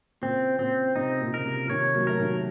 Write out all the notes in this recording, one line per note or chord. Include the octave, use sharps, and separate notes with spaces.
A#2 C#3 C4
A#2 C#3 C4
C3 D#4
A#2
C#3 A#4
C3
F3
C3 D#3 C#5
F#3 A#3
A3 A#4
D#3 F#3